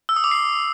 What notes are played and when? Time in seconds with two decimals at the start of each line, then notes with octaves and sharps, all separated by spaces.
0.09 E6
0.16 D#6
0.24 D6
0.31 C7